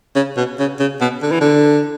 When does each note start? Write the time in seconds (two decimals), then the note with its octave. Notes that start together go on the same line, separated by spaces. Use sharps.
0.16 C#3
0.37 B2
0.59 C#3
0.80 C#3
1.01 B2
1.23 D3
1.32 E3
1.41 D3